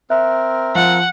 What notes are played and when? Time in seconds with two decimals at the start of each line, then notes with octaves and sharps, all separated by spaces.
0.10 C4 A#4 E5 F#6
0.75 F3 F#5